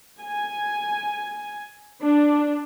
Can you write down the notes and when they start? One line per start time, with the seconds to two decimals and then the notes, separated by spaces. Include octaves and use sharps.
0.21 G#5
2.02 D4